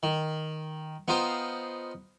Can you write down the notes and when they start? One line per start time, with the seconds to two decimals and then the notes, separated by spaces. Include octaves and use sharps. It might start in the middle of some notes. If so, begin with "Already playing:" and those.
0.03 D#3
1.08 B3 D#4 F4 C5 G5